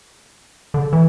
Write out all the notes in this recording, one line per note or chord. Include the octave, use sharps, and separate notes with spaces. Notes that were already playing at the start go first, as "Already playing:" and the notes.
D3
E3